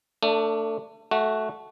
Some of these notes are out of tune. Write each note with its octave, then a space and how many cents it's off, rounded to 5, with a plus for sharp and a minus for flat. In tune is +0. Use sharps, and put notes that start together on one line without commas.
A3 +25 D4 +0
A3 -15 F#4 +5